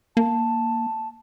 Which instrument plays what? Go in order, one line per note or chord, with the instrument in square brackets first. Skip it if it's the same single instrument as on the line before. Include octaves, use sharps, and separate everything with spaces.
[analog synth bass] A#3 [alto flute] A5